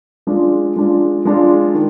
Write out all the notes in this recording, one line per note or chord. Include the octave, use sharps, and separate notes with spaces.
G#3 D4 F4
G#3 D4 F4
G#3 D4 F4
D#3